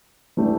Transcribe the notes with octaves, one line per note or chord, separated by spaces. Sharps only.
E3 A3 D4 G4